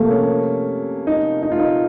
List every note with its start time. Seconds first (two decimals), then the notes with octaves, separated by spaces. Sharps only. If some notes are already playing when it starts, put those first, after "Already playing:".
Already playing: C3 F3 A3 A#3
0.11 C#4
1.07 D#4
1.43 D#4
1.52 F4
1.59 D#4